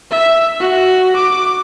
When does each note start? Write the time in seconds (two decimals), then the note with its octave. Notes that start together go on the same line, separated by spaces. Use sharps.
0.10 E5
0.60 F#4
1.16 D6